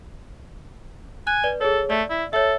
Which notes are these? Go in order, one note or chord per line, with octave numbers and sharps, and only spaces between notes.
G#5 F#6
B4 D5
G#4 A4 C#5
A3 D5
E4
A4 C#5 E5